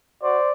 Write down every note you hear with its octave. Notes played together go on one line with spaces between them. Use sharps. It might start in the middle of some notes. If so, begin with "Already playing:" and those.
F#4 C5 D5